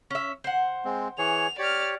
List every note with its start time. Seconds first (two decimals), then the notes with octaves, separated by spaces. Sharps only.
0.11 C#4 E5
0.44 C5 F#5
0.85 G#3 C4
1.18 E3 G#4 C#5 F7
1.59 G4 C#5 D5 F6